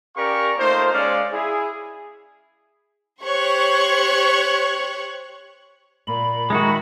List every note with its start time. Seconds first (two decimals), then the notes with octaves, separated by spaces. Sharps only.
0.16 C#4 G4 A#4 D5 F5 C#6
0.58 A3 A#3 D#4 F4 C5
0.93 G#3 C#4 D5 F5
1.32 E4 G#4
3.22 G4 C5 C#5 C#6 F#6
6.07 A#2 B5
6.50 D#3 G#3 D#4 F#4 E5